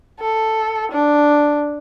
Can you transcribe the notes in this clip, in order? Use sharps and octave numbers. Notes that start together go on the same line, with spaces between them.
A4
D4